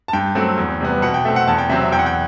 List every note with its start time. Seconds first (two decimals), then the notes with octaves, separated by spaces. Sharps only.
0.08 A5
0.13 G2 G5
0.35 F#3 A3 C4
0.58 E2
0.80 C3 G3 B3
1.02 B2 F#5
1.14 G5
1.25 A3 C4 E5
1.36 F#5
1.47 E2 A5
1.58 G5
1.69 C3 F#3 C4 E5
1.81 E5
1.92 E2 G5
1.99 F#5
2.06 G5